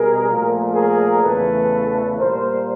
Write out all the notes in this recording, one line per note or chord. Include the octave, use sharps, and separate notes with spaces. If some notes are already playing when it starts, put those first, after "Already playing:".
Already playing: B2 G3 G#4 A#4
A#2 F3 A3
G#4 A#4
E2 C#3 E3 A3 A4 B4
A#2 G3 A#4 C5